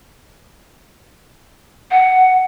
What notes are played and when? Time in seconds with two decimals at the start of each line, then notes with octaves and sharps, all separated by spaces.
1.91 F#5